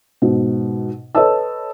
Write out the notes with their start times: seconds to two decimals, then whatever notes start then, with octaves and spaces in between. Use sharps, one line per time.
0.22 G#2 B2
1.15 A4 B4 C#5 D#5 A5 E6